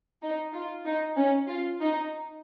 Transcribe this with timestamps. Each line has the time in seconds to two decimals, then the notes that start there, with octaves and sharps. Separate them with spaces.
0.22 D#4
0.54 F4
0.86 D#4
1.17 C#4
1.48 F4
1.81 D#4